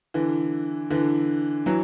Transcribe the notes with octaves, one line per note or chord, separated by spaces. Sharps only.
D3 E3
D3 E3
E3 F#3